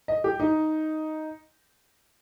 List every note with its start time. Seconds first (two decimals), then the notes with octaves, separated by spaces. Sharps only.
0.08 D#5
0.24 G4
0.40 D#4